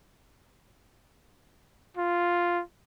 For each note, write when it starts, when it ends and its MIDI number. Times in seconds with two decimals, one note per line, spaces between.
1.97 2.62 65